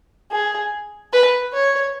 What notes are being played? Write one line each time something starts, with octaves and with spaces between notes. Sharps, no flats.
G#4
B4
C#5